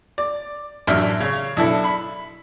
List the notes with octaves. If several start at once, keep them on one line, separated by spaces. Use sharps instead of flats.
D5
A1 F#2 D4 E5 F6
C#3 C#5
B1 D4 E4 A4
B5